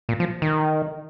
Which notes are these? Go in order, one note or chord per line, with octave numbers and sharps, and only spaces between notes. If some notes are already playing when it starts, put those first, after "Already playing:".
A#2
F3
D#3